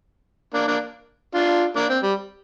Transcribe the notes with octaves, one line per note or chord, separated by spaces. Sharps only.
A#3 D4
A#3 D4
D4 F4
A#3 D4
C4
G3